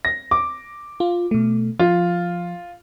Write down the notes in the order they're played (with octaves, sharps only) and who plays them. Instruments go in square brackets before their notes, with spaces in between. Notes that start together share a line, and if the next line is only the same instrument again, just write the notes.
[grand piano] A#6
D6
[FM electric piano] F4
B2 A3
[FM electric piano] F3 [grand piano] F4